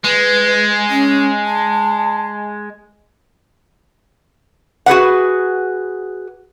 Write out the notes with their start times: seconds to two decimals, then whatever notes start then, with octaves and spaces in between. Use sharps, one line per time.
0.04 G#3 B4
0.90 C#4
1.45 A5
4.86 F#4 G#4 B4 F#5